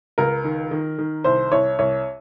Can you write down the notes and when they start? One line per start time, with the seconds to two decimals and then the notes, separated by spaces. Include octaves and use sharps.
0.18 C#2 A#4
0.44 D#3
0.71 D#3
0.99 D#3
1.24 C2 C5
1.52 C2 C#5
1.79 C2 C#5